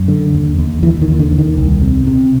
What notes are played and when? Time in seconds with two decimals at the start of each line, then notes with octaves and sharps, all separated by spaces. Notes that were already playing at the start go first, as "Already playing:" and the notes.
Already playing: F#2
0.08 D3
0.33 D#2
0.58 D#2
0.82 D#2 E3
1.02 D#3
1.08 D#2
1.19 D3
1.32 D#2
1.38 D#3
1.57 C2
1.81 C3
2.07 C3